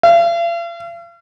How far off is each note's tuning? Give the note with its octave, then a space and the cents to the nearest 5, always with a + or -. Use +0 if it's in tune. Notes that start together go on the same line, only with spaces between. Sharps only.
F5 -45